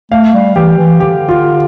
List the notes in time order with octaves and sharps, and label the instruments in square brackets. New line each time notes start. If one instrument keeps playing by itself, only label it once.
[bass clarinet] A3 [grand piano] F5
[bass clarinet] G3
[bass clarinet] E3 [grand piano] G4
[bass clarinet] E3
[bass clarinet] D3 [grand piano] G4
[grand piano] F4